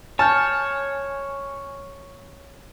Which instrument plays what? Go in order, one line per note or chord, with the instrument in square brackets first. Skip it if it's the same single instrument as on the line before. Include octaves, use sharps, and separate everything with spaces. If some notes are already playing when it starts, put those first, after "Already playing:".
[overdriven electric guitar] C#5 [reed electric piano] G#5 F6 G6 [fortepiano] A5